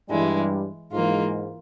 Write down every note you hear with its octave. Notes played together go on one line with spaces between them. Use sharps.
G2 E3 G3 G#3 E4
G#2 E3 G#3 A#3 F4